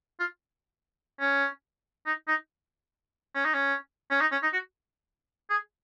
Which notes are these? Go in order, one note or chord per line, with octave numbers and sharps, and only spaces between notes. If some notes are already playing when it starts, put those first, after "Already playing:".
F4
C#4
D#4
D#4
C#4
D#4
C#4
C#4
D#4
C#4
D#4
F#4
G#4